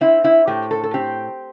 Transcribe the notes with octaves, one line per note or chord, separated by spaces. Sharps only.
C4 E4
E4
A2 G4
A4
A4
C4 G4